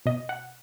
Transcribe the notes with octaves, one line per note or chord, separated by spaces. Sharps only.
B2 D#5
F#5